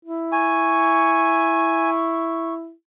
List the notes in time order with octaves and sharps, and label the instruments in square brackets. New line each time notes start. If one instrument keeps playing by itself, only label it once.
[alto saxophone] E4
[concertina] G#5 [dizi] C#6